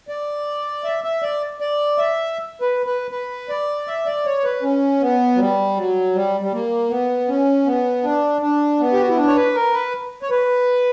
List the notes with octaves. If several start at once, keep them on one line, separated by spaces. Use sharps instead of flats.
D5
E5
E5
D5
D5
E5
B4
B4
B4
D5
E5
D5
C#5
B4
C#4
B3
F#3
G3
F#3
G3
G3
A#3
B3
C#4
B3
D4
D4
B3
G4
F#4
E4
D4
C#5
B4
A#4
B4
C#5
B4